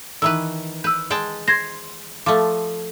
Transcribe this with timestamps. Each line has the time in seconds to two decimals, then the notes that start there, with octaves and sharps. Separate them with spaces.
0.22 D#3 E3 B4 E6
0.84 B4 E6 G6
1.11 G#3 G5 A5
1.48 C5 C6 G#6 A#6
2.26 F3 A3 D6